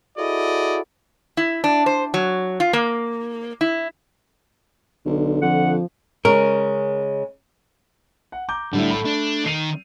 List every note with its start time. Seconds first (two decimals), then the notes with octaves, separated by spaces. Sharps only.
0.17 E4 F#4 G#4 A4 D5 D#5
1.37 E4
1.64 D4
1.86 C5
2.14 F#3
2.60 F4
2.73 A#3
3.61 E4
5.06 B1 D3
5.42 F2 F3 F#5
6.25 C#3 G#3 C#4 A#4
8.32 F#5
8.49 A#5 D6 G6
8.73 A2 D3 G3 E4
8.90 A3 B5
9.05 D4
9.46 D#3 C7 D#7 F7